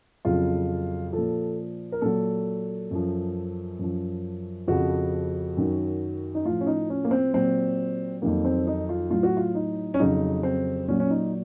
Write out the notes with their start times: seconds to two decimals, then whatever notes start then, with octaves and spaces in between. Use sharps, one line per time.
0.25 F2 C#3 F#3 F4
1.13 F3 A4
1.18 A#2
1.92 A#4
2.02 A#2 F#3 A4
2.91 F#2 F3
3.79 F#2 F3
4.68 F2 C#3 F3 F#4
5.57 F#2 D#3 F#3
6.35 D#4
6.45 A2 F3 F4
6.61 C#4
6.67 D#4
6.90 C#4
7.04 A#3
7.11 C4
7.34 A#2 F#3 C4
8.22 F2 D#3 F#3 A#3
8.45 C4
8.67 D#4
8.89 F4
9.10 A2 F#3 F4
9.23 F#4
9.37 F4
9.55 D#4
9.94 C#4
9.99 F2 C#3 F#3 D#4
10.43 C4
10.88 A#2 F#3 C#4
11.00 C#4
11.10 D#4